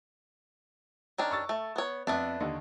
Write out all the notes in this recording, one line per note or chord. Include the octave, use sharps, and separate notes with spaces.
D#3 C#4 D4
C#6 E6 A6
A3
B3 C#5
F2 A3 B3 D4
D#2 D3 D#5